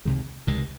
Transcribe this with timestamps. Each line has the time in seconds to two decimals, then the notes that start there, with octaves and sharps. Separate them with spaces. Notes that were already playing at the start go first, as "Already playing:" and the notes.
0.05 C#2 C3 D#3 G#3
0.47 C#2 C3 D#3 G#3